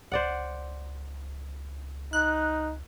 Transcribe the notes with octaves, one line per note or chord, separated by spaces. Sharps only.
C#2 C5 D5 F#5
D#4 F#6